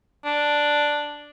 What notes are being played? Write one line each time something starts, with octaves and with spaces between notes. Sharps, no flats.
D4